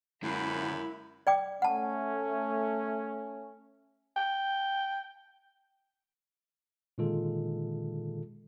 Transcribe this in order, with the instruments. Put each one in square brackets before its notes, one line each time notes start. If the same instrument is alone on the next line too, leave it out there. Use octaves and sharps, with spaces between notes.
[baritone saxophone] F#2 [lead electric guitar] D3 G#3 [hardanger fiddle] A#3 B5 [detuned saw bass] E4
[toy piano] D5 G5 D6
[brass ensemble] A3 C#4 [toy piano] F#5 A5
[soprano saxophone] G5
[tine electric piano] A#2 D3 D#3 G#3 F4 A4